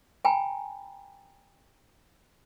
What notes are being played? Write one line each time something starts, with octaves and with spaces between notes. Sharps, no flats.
G5 G#5 A#5 B5